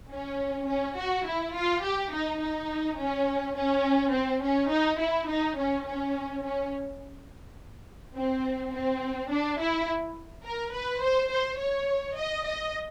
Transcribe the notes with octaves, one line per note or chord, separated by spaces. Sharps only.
C#4
C#4
F#4
E4
F4
G4
D#4
D#4
C#4
C#4
C4
C#4
D#4
E4
D#4
C#4
C#4
C#4
C4
C4
D4
E4
A#4
B4
C5
C5
C#5
D#5
D#5